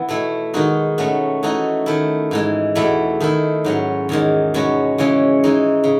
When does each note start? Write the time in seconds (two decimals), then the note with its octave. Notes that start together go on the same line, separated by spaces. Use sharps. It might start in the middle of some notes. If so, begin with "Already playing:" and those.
Already playing: E3 B3
0.09 B2 A3 E4
0.54 D#3 G#3 D#4 F#4
0.98 B2 A3 C#4 F#4
1.43 E3 A3 D#4 F#4
1.86 D#3 A3 E4
2.31 G#2 E3 G#3
2.75 E2 B2 A3 E4
3.20 D#3 A3 E4
3.64 G#2 F#3 C#4
4.09 E2 D#3 G#3
4.54 B2 G#3 C#4 F#4
4.98 C#3 E3 G#3 C#4
5.44 E3 G#3 D#4
5.84 C#3